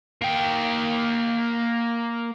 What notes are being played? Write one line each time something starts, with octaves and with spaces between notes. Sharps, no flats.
A#3 G5